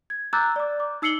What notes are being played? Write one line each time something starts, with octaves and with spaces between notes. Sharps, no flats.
G#6
A#5 D6 E6 F#6 G6 A6
D5 D6
D6
D#4 E6 C7 C#7 F#7 G7